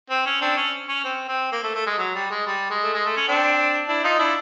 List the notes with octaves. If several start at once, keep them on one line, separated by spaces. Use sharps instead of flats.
C4
C#4
C4 D4
C#4
C#4
C4
C4
A#3
A3
A3
G#3
F#3
G3
G#3
G3
G#3
A3
G#3
A3
C#4
C4 D4
D4 E4
D#4 F4
D4 E4